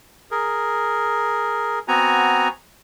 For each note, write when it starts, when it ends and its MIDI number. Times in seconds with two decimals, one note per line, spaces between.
0.31 1.79 68
0.31 1.79 70
1.88 2.48 59
1.88 2.48 60
1.88 2.48 66
1.88 2.48 80
1.88 2.48 82